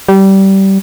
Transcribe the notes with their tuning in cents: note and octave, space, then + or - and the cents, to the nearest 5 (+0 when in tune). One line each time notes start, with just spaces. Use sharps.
G3 -20